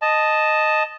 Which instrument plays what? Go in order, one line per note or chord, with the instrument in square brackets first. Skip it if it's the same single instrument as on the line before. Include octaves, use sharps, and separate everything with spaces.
[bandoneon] D#5 A5